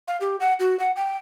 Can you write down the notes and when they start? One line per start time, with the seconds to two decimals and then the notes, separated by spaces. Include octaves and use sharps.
0.08 F5
0.21 G4
0.40 F#5
0.60 F#4
0.80 F#5
0.96 G5